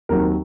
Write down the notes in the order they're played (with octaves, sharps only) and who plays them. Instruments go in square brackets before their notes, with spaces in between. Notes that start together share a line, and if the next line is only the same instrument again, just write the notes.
[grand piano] D#2 D#3 F#3 C4 A#4